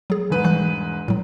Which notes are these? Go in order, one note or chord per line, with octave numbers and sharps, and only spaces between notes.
F#3 G#4
E1 G#2 B4
E3 G3 F#6
A2 F#3